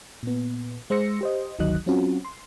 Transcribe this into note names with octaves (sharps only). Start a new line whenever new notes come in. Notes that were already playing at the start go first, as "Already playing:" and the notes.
A#2 B3
G#3 C5 C6 E6 A#6 C#7
G4 C5 D#5
G1 D2 D#3 F#3 D#5 F#6
F#3 C4 C#4 F4 F#4
C6